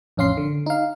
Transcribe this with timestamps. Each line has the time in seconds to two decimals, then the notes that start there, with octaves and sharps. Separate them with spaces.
0.17 A1 F2 C#4 F5 C6 C7
0.37 D3
0.66 D#4 F5